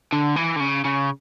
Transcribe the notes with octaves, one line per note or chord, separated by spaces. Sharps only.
D3
E3
D3
C#3
C#3